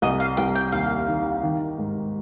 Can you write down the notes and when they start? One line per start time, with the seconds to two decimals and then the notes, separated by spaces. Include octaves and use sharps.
0.02 C2 D#5
0.20 F5
0.37 C2 G5
0.55 G5
0.72 D#2 F5
1.08 D#3
1.43 D#3
1.78 G#2